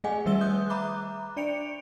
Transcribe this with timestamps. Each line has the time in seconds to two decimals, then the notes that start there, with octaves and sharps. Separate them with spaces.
0.04 A3 G#4 D#5 F#5 G#5
0.26 D#3 G3 B4 E5 E6 G7
0.41 D#6 F#6 G6
0.70 E5 A#5 B5 D6 F#6
1.36 D4 D5 C#7 D7 F7